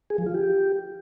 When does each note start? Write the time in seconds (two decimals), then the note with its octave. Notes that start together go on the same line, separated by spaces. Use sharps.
0.10 G#4
0.18 F3
0.26 F4
0.34 G4